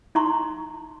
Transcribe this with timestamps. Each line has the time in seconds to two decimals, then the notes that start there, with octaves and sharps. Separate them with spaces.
0.15 D#4 E5 A#5 C6 C#6